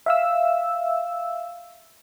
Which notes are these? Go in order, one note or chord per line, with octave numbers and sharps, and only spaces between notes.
E5 F5 E6